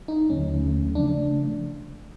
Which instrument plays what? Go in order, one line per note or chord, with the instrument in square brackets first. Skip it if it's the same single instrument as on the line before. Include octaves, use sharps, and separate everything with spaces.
[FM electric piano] D#4
[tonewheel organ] D#2 D3 F#3 A3 [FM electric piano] C#4
[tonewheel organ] C#3 F3 A3 [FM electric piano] D4